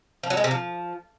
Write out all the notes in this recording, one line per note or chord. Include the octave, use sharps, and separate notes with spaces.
F3
F#3
G#3
C3
F3